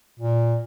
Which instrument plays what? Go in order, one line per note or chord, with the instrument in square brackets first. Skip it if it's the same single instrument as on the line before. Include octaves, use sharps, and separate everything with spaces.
[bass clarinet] A#2